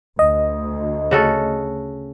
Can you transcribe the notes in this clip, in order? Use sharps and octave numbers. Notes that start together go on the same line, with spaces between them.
D2 D#5
C#3 F#4 A4